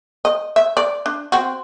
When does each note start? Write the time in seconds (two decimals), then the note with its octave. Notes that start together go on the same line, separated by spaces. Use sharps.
0.25 D#5
0.56 E5
0.77 D5
1.06 D4
1.32 C4 F#4